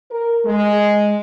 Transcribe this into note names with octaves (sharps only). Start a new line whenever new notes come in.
A#4
G#3